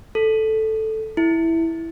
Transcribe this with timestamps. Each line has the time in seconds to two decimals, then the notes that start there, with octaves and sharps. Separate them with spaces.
0.15 A4
1.17 E4